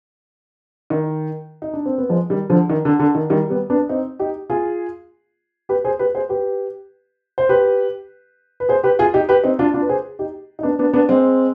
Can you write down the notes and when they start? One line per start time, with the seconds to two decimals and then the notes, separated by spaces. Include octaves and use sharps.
0.90 D#3
1.62 D#4
1.73 D4
1.86 C4
1.98 B3
2.09 F3 G#3
2.30 D#3 G3
2.50 D3 F3
2.70 D#3
2.85 D3
3.00 D3
3.15 D#3
3.30 D#3 G3
3.50 G3 B3
3.70 B3 D4
3.89 C4 D#4
4.19 D#4 G4
4.50 F4 G#4
5.69 G4 B4
5.85 G#4 C5
5.99 G4 B4
6.15 G#4 C5
6.29 G4 B4
7.38 C5
7.49 G4 B4
8.60 B4
8.69 G#4 C5
8.83 G4 B4
8.99 F4 G#4
9.14 D#4 G4
9.29 G4 B4
9.44 C4 D#4
9.59 D4 F4
9.74 D4 F4
9.82 B4
9.89 G#4 C5
10.19 D#4 G4
10.59 D#4
10.63 B3 D4
10.79 B3 D4
10.93 B3 D4
11.09 G#3 C4